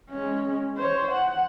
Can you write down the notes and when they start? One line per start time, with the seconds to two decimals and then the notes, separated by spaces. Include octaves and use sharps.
0.10 G#3 C#4
0.77 C5 C#5
1.12 F#5